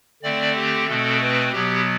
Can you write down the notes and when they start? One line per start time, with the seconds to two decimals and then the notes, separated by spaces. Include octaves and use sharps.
0.23 D3 A3 C4 D5
0.55 G4
0.88 B2 A3 C4 A4
1.20 B4
1.52 B2 F#3 B3 G4